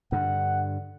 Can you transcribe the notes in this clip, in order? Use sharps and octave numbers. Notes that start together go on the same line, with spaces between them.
G2 D3 F#5